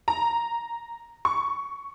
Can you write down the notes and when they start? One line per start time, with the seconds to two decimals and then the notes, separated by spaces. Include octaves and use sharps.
0.08 A#5
1.25 C#6